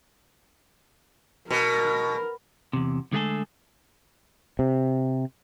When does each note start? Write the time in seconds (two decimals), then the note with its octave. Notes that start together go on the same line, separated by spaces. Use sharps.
1.51 B2 A#4
2.73 E2 C3
3.13 D3 G#3 A3 C#4 G#4 A4
4.59 C3